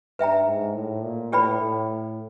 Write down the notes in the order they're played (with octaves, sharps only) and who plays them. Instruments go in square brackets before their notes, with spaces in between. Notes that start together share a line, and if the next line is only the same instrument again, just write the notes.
[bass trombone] G2 [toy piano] B4 E5 G5 A#5
[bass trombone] G#2
A2
A#2
[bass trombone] A2 [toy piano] G4 B4 D5 G5 B5
[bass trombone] A2